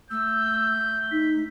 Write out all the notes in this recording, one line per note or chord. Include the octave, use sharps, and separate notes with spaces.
A3 E6 G6
D#4 B6